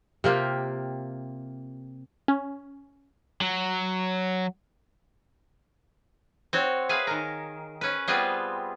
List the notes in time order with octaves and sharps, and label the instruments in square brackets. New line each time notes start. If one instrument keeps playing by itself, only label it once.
[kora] C3 A#3 F4 G4
[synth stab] C#4
[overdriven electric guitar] F#3
[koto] C4 F#4 C#5
G#4 B4 E5 F5 G#5
D#3 A#4
C#4 B4
G3 B3 C4 F4 G#4 B4